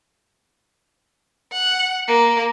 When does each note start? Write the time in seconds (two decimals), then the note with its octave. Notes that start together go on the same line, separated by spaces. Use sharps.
1.53 F#5
2.08 A#3